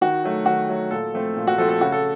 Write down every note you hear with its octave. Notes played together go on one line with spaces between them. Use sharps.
D#3 F#4
F#3 A3
D#3 F#4
F#3 A3
A#2 A4
F3 A3 C4
A#2
F#4
F3 A3 C4 A4
A4
C#3 F#4
A4